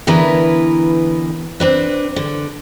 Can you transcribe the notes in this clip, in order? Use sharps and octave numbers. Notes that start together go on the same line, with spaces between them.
D3 E3 B3 E4 A#4 B4
C4 D4 B4
D3